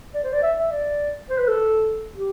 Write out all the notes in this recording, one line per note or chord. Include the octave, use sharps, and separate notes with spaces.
D5
C5
D5
E5
E5
D5
C5
B4
A4
G4